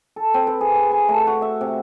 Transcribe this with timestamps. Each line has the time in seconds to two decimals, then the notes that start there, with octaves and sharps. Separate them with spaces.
0.16 A4
0.34 C4
0.47 B4
0.61 G#4
0.77 C5
0.92 G#5
1.09 A3
1.27 F#4
1.42 E5
1.61 C3